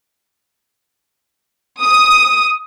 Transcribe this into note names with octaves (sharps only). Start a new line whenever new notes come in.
D#6